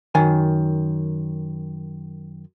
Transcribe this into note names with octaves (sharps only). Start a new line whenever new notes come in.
F#2 D#3 G#5